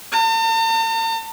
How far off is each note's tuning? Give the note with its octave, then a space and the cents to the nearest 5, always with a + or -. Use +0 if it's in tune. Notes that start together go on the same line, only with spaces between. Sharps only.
A5 +45